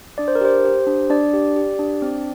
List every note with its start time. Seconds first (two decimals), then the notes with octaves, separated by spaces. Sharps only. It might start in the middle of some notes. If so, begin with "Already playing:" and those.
0.18 D4 D5
0.28 C5
0.35 A#4
0.41 G4 C5
0.65 G4
0.87 D4
1.10 D4 D5
1.33 G4
1.56 G4
1.79 D4
2.02 C4